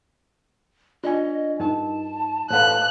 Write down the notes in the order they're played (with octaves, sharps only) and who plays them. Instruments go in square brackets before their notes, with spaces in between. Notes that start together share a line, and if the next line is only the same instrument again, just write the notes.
[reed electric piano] D4 G#5 [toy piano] F4 [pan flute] D#5
[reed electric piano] G2 [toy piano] D#4 A#4 D#5 [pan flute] A5
[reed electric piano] A2 A4 B4 [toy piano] C#5 F5 [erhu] F#6